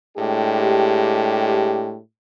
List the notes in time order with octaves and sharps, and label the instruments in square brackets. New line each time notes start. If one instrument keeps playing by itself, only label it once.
[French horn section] A2 G#3 D4 G4